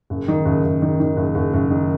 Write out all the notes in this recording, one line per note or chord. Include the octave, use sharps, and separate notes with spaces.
F#1
D#3
F#1
F#1
D#3
D#3
F#1
F#1
F#1
D#3